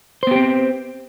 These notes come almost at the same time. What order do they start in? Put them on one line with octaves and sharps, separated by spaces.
C5 B3 G4 C4